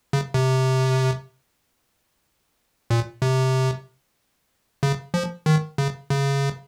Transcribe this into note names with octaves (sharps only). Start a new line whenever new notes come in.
C#3
C3
A#2
C3
C#3
F3
D#3
C#3
C#3